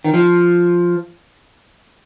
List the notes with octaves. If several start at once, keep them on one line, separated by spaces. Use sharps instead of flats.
D#3
F3